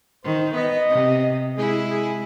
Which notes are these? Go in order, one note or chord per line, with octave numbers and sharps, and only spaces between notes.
D#3 C5
B3 D#5
C3
G#3 E4 G#4
G#4